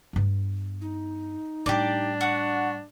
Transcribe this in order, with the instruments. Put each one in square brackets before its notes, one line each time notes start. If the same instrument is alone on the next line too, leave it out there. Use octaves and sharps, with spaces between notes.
[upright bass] G2 B3
[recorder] D#4
[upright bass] A2 G3 [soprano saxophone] D4 [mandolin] G4 D5
[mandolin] F#4 [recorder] F#5